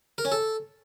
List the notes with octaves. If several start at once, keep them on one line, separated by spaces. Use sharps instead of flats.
A#4
C#4
A4